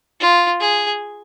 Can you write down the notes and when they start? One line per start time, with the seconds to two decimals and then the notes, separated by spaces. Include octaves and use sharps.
0.20 F4
0.61 G#4